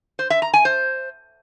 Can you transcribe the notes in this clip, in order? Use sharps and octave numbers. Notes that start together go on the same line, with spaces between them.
C5
E5
A#5
G#5
C5